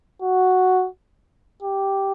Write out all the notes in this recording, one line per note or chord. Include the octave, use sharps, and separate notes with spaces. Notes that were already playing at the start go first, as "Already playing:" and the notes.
F#4
G4